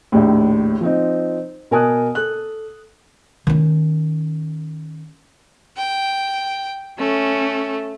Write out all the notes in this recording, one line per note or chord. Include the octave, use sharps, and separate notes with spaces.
A#1 D#2 A2
F3 C4 D#4
B2 A#4 G#5 A5 D#6 F#6
A4 F#6
D#3 C#4
G5
A3 C#4